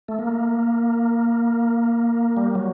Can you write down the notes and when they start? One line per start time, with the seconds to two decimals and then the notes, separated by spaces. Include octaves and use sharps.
0.08 A3
0.19 A#3
2.37 G3
2.55 F#3